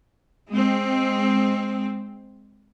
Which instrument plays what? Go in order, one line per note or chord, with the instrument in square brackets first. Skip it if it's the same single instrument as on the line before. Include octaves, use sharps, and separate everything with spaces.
[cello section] G#3 C4